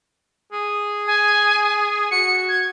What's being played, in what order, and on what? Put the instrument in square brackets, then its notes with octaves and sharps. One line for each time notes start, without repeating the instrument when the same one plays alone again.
[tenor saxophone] G#4
[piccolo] G#5
[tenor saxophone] F#4 [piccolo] C#7
[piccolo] G#6